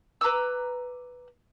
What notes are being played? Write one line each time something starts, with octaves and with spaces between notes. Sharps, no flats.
B4 A#5 D6 E6